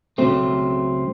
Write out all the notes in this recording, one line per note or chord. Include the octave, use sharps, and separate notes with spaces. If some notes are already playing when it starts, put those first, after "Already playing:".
C#2 C#3 F#3 A3 C4